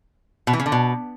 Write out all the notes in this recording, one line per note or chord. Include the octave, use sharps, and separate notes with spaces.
B2
E3
C#3
D3
B2